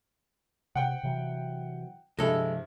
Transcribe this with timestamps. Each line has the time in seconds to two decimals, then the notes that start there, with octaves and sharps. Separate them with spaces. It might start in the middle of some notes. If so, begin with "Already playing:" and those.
0.75 C3 F#5 G5
1.03 C3 E3 F#3
2.19 G2 C3 F3 G#3 E4 A4